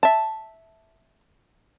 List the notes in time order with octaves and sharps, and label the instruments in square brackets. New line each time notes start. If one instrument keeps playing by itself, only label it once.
[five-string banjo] E5 A5